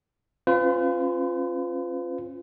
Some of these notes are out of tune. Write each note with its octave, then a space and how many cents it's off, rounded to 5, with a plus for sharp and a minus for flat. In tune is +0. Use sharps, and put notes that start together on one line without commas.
C#4 -30 F4 +0 B4 +45